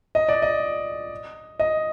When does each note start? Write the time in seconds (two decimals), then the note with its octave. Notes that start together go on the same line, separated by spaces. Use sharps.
0.15 D#5
0.29 D5
0.42 D#5
1.60 D#5